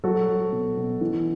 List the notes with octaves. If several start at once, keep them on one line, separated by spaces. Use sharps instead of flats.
F#3 F#4 A4
F#3
B2
B2
E3